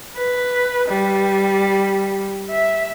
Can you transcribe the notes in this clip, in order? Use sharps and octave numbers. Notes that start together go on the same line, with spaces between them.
B4
G3
E5